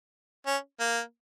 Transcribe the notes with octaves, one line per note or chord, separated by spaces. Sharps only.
C#4
A#3